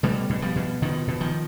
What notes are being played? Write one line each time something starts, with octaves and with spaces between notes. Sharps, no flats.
B2 G3 A3
B2
F3 G3
B2
B2 D#3 F3
B2
D#3 F3